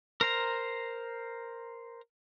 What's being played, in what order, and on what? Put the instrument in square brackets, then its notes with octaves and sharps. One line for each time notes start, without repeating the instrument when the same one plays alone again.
[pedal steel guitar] A#4 C5 A#5